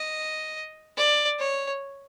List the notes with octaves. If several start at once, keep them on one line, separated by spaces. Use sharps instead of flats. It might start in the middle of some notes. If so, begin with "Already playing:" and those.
Already playing: D#5
D5
C#5